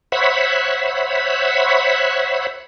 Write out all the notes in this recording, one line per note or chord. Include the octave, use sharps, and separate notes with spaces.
C5 C#5 E5 F#5 B5